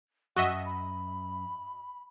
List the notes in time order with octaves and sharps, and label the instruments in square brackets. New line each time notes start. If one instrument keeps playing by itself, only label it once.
[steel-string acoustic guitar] F#2 [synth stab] F#4 D#5 E5 [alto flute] F#5
[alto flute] B5